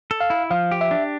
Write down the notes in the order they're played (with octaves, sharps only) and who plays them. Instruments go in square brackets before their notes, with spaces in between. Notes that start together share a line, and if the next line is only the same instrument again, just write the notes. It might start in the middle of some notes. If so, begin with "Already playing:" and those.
[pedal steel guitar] A4
[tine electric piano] F5
[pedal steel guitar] E4
[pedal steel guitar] F3 [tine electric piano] F5
[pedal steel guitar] G4
[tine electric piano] E5
[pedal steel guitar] D4